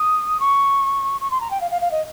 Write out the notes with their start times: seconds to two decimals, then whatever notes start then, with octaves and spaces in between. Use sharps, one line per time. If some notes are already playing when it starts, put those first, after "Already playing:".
Already playing: D#6
0.39 C#6
1.20 C#6
1.30 C6
1.40 A#5
1.50 G5
1.60 F5
1.71 F5
1.81 F5
1.91 D#5